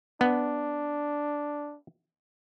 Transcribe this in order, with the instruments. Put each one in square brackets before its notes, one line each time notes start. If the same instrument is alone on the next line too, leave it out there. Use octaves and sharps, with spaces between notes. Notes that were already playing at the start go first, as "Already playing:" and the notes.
[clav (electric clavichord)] B3 [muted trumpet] D4